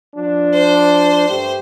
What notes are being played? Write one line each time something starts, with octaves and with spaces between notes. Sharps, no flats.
F3 D4
C5
G2 A3 G4